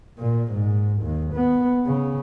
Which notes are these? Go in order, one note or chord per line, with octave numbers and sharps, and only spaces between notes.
A#2
G#2
D#2
B3
C#3